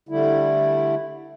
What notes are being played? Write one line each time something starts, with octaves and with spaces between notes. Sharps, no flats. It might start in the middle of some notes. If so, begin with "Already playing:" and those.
D3 G3 A3 E4